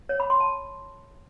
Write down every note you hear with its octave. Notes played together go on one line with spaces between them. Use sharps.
C#5
B5
C6
A5